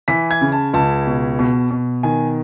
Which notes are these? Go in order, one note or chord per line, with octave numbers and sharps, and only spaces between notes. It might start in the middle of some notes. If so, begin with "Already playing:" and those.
E3 B6
G#6
C#3
A5
C#2 A5
B2
B2
B2
D#3 G#5